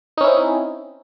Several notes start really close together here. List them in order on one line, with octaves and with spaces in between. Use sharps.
D#4 C#4 E4 C4